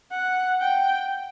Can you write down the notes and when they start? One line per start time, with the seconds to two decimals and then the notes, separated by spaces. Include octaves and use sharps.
0.11 F#5
0.61 G5